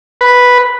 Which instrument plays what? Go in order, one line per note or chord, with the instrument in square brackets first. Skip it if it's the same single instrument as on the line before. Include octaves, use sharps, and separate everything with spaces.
[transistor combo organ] B4